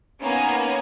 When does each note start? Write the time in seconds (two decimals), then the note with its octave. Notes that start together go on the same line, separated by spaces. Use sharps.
0.22 A#3 B3 C#4 D#4 G#5 A#5